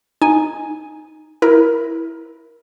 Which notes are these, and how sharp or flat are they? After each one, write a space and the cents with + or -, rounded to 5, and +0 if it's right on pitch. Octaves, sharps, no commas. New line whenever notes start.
D#4 +0 G#5 +0
E4 +0 A#4 +15